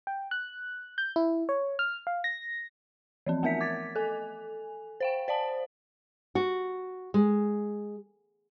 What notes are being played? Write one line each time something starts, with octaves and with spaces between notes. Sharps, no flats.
G5
F#6
G6
E4
C#5
F6
F5
A#6
E3 F3 C4
A3 B3 A#4 E5 B6
D6 G#6 A6 B6
A4 G#5
C5 F5 G5
C5 D5 F5 A5
F#4
G#3